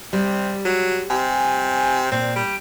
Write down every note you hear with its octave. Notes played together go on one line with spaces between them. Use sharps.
C3 G3
F#3
C3 G#5
A#2 C4
G3 D7